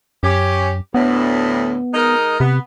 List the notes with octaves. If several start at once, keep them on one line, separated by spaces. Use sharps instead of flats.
F#2 C#4 G4
D2 A2 B3
G#3 D#4 A#4
C3 B3